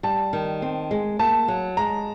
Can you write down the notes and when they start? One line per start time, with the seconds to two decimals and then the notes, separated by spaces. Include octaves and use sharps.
0.03 G3 A5
0.33 D#3
0.62 C4
0.91 G#3
1.19 A#3 A5
1.48 F#3
1.77 G#3 A#5